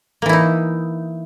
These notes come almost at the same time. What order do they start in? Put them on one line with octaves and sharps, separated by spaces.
A#3 E3 E4 D#4